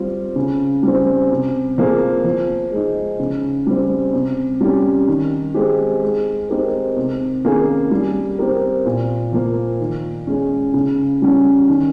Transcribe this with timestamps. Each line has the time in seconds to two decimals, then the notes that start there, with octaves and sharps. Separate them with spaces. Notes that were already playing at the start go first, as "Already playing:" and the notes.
Already playing: G3 C4 F4
0.36 C#3
0.83 G3 C4
1.31 C3
1.78 F3 A#3 F4 G#4
2.25 F3
2.72 G#3 D#4
3.19 C#3
3.67 G3 C4
4.13 C3
4.61 G3 C#4 G4
5.08 D#3
5.54 G#3 C4 G4
6.02 G#3
6.49 C4 D#4 G4 A#4
6.96 C3
7.44 D#3 A#3 C#4 G#4
7.91 G3
8.38 C4 G4 A#4
8.86 A#2
9.33 F3 A#3
9.80 D#3
10.27 G#3 C#4
10.74 C#3
11.22 G3 C#4
11.69 D#3